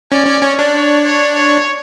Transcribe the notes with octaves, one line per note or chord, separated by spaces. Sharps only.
C#4 D5
C#4
C#4 C#5
D4
C#5
C#5
C#5